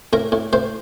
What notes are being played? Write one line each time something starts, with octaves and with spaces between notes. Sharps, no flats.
A2 A#4
A2
A2 C5